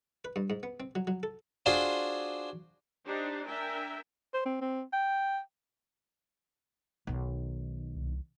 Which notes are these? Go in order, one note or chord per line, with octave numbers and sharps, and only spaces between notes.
B4
G2
G#2
B3
C4
F#3
F#3
A4
D4 F4 F#4 G#4 C5 D5
D4 D#4 G4 C5
D4 A#4 E5 G5 G#5
C5
C4
C4
G5
B1 D#3
C2